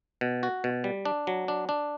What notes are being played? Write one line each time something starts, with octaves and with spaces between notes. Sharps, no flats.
B2
F#4
B2
G3
D4
F#3
D4
D4